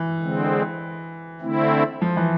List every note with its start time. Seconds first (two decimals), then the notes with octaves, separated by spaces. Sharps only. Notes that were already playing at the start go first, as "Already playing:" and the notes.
Already playing: E3
0.20 D3 G#3 C4
1.41 D3 A3 C4 E4
2.02 F3
2.17 E3